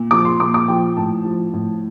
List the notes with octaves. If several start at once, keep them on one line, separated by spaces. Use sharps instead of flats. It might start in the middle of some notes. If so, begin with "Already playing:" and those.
Already playing: A#2
F3 D6
C6
A#2 D6
D6
F3 G5
A2 A5
F3
A2